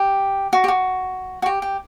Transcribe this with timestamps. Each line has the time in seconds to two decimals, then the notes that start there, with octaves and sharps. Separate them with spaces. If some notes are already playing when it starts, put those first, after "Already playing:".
Already playing: G4
0.53 F#4
0.64 G4
0.68 F#4
1.42 F#4
1.46 G4
1.62 G4